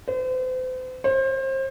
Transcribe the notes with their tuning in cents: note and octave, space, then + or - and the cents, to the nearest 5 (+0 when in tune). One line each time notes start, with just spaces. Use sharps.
C5 -40
C5 +30